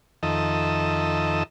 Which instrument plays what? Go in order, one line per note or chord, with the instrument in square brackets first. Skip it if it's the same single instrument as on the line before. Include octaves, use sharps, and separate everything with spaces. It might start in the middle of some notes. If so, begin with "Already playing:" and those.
[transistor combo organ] F2 D#3 A4 D#5 E5